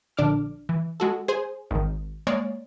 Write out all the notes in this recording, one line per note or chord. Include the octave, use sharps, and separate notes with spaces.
A#1 D3 D4 D6 F6
E3
G#3 F#4 A4
G#4 C5 G#5
G#1 D#3
G#3 A#3 C#5 D5